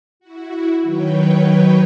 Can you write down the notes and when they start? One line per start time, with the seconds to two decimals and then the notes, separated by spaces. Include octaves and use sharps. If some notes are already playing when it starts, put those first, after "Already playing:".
0.20 E4 F#4
0.81 D#3 F#3 B4 C#5 G5